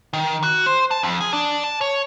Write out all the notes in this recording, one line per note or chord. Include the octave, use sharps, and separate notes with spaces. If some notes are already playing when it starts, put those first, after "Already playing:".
D#3
F#4
C5
A5
F2
G#4
D4
A5
C#5